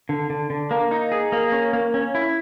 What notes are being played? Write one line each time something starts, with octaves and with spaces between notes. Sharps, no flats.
D3
D3
D3
A#3
D#4
G#4
A#3
C#4
A#3
C#4
E4